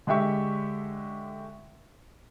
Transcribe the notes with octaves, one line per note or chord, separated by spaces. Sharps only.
D3 G#3 G4 E5 C#6